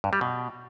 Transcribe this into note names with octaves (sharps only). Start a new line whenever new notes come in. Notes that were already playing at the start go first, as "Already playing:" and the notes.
G2
G3
B2